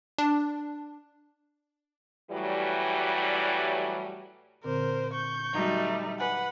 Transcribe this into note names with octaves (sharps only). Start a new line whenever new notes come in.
D4
A2 E3 F#3 G3
A#2 D3 C4 A#4 C5
C#6 G6
F#3 G3 A3 D#4 F#4
B4 F#5 G#5